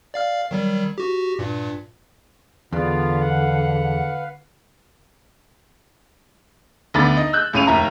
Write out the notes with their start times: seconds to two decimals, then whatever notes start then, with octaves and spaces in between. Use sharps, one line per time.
0.14 D5 F5 F6
0.51 D#3 F#3 G3
0.98 F#4 G4
1.39 G2 A#2
2.73 E2 D3 B3 F4 B4 D5 F5
3.22 F#5
6.94 D2 D3 B3 B5 A6
7.17 D#4 D#5
7.33 E6 F#6 G6
7.53 C#2 A2 C#4 D#7 F7
7.67 F1 D#2 E4 A#5